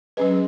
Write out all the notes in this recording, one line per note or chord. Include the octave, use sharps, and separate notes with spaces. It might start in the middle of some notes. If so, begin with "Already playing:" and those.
F#3 G#3 C#4 B4